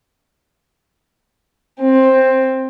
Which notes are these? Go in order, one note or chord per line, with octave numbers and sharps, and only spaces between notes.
C4